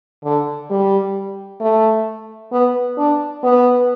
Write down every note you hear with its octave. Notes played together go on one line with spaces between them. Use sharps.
D3
G3
A3
B3
D4
B3